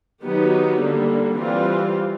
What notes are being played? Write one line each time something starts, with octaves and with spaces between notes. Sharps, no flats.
D#3 F#3 B3 D#4 G4
D3 G3 A#3
E3 G3 C4 F4